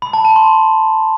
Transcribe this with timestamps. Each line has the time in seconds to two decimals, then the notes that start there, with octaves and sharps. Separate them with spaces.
0.02 B5
0.13 A5
0.25 A5
0.36 C6